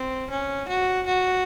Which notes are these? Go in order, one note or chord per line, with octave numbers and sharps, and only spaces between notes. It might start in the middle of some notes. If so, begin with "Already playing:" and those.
Already playing: C4
C#4
F#4
F#4